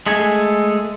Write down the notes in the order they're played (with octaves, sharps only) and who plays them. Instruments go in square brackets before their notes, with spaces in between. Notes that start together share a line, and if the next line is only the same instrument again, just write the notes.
[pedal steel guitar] G#3 A3 G#4 A4 G#5